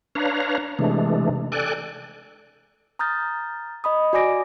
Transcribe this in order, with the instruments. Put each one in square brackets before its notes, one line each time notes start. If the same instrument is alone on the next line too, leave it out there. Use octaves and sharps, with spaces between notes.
[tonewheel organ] D4 B4 C#5 F5 A#5
C3 E3 G#3 A3 D4
A4 D5 G5 G#5 F#6
[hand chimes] A#5 D#6 F6 G6 A6
D#5 B5 D#6
F#4 D5 G#5 D6 A#6 D7